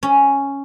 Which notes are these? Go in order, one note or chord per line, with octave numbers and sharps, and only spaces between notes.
C#4